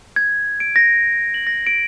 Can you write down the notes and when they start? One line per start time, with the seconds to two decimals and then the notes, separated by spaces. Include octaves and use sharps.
0.16 G#6
0.60 D7
0.76 A#6
1.34 F#7
1.47 A#6
1.67 D7